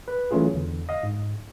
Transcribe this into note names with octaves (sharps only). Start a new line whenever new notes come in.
B4
E3 F#3 A3 C#4 F4 G#4
E2 D3
D#5 F5
G#2